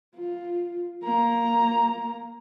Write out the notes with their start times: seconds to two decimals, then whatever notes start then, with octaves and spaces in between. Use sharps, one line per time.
0.16 F4
1.04 A#3 A#5